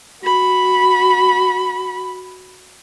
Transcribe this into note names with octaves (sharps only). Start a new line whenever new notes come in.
F#4 B5